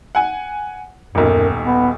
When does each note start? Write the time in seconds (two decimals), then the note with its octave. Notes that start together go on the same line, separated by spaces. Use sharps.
0.15 F#5 G#5
1.15 D#1 B1 F#2
1.64 B3